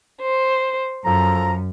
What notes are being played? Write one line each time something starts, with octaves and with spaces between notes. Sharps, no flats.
C5
F#2 F3 A4 A#5